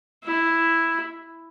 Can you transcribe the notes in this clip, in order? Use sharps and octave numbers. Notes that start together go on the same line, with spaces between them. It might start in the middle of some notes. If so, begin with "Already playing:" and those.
E4